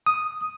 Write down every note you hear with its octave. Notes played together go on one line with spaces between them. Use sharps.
D#6